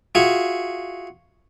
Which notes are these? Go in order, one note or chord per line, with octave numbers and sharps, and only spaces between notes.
F4 F#4 G#4 E5